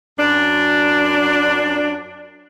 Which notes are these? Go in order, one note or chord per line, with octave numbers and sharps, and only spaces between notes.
F#2 D4